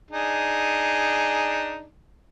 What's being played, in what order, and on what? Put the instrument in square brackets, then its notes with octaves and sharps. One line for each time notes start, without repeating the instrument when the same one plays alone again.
[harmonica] D4 D#4 G#4